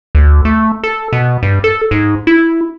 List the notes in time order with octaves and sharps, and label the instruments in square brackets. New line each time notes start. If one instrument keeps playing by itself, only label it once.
[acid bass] D2
A3
A4
B2
G2
A4
G#2
E4